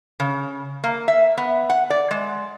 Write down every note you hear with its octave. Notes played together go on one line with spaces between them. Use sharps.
C#3
A#3
E5
B3
F#5
D5
G#3